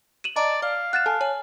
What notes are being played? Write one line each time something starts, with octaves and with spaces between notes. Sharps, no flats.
D#7 E7 F#7
D5 D#5 A5 A#5
D5 F5
F#5 F#6 A6 E7
A4 G#5 A5 F6
C#5 G#5